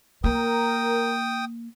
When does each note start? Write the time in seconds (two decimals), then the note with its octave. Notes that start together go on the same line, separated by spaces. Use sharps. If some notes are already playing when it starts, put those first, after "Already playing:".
0.24 A#3 A#4 G5 D#6